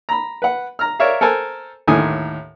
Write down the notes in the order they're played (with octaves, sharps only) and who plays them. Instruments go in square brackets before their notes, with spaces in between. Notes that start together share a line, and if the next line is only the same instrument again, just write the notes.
[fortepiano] A#5 B5
B4 F#5
A#5 F6
A#4 C#5 D5 E5 F5
A4 A#4 C5 G#5 A5
D#2 A2 D3 D#3 G#5 D#6